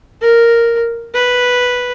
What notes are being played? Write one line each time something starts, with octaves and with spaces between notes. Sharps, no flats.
A#4
B4